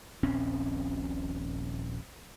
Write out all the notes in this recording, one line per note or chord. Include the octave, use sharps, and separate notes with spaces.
D#1 A#1 C4 C#4